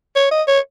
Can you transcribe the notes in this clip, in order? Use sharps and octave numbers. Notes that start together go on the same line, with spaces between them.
C#5
D#5
C#5